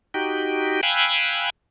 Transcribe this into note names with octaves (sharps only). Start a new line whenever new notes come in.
D#4 F#4 G4 G5
F5 G5 G#5 B5 E6 F#6